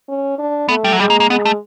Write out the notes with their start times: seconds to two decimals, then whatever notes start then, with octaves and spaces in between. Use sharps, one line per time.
0.08 C#4
0.39 D4
0.69 A3 B3
0.84 G3
0.93 F#3
1.00 G3 G#3
1.10 A#3
1.20 A#3
1.30 G#3 B3
1.45 A3